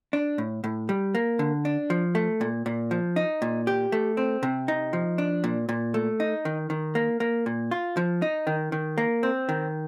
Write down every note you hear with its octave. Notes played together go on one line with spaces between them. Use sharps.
D4
A2
A2
G3
A#3
D3
D4
F3
A3
A#2
A#2
F3
D#4
A#2
G4
A3
C4
C3
D#4
F3
D4
A#2
A#2
A3
D#4
D#3
D#3
A#3
A#3
A#2
F4
F3
D#4
D#3
D#3
A#3
C4
D#3